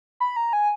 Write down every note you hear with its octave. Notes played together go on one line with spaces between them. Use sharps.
B5
A#5
G#5